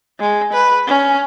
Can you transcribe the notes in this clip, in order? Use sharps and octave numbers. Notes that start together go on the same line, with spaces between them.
G#3
B4
C#4